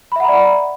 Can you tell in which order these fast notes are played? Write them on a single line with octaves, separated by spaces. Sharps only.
B5 E5 F#5 A#5 D5